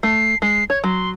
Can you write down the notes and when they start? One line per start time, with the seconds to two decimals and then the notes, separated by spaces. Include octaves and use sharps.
0.03 A3 C7
0.42 G#3 C7
0.70 C#5 G#6
0.84 F#3 C6